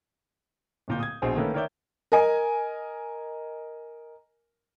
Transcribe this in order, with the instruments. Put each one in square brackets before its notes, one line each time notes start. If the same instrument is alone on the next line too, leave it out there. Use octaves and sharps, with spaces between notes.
[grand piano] D1 A#2 G6
D#6 G#6
A#1 B2 G#4 C5
D#3 A3 A#3 C#4 A4 B4
D#3 A#4 C#5 D5 E5 G6
[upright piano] A#4 D#5 G#5